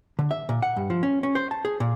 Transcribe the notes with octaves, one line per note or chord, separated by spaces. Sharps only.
D3
E5
A#2
F#5
G2
F3
C#4
C#4
C5
A5
G#4
A#2